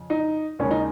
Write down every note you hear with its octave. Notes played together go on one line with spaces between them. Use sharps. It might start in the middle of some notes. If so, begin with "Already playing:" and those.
Already playing: F2 C#3
D#4
D#2 C#3 G#3 C#4
D#4